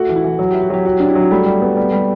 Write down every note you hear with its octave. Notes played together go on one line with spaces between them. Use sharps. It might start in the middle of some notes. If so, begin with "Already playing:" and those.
Already playing: A3 F#4
E3
E4
E3
F#3 F#4
E4 G4
F#4
F#3 G4
F#4 G4
D4
E4
F#3 F#4
E4
G3 A3
G3
B3
G3
G3